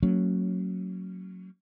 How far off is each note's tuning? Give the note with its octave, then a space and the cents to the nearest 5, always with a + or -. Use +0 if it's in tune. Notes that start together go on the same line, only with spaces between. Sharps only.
F#3 +0 A#3 -35 C#4 -5